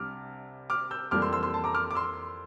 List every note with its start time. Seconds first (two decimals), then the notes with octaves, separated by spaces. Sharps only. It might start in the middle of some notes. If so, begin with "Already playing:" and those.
Already playing: C2 C3 G3 D4 D6 F6
0.70 D6 F6
0.91 E6 G6
1.11 F2 E3 G3 A#3 D6 F6
1.22 C6 E6
1.33 C6 E6
1.43 C6 E6
1.54 A5 C6
1.64 A#5 D6
1.74 D6 F6
1.91 D6
1.95 C6 E6